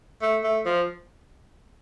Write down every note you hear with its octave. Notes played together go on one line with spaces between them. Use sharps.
A3
A3
F3